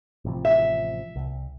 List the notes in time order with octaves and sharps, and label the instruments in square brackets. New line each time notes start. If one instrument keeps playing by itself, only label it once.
[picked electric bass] A1 C3 F3
[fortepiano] E5
[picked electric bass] C2